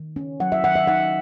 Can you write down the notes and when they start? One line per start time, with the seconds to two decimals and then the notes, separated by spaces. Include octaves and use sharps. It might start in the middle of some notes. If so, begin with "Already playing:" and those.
Already playing: D#3
0.16 C#4
0.40 F#3 F#5
0.52 E5
0.64 D#3 F#5
0.75 E5
0.88 D#4 F#5